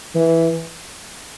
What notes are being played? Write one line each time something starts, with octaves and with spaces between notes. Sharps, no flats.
E3